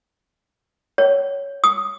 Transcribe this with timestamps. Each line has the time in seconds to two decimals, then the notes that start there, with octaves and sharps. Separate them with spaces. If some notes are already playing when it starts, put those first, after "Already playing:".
0.98 C#5
1.64 D#6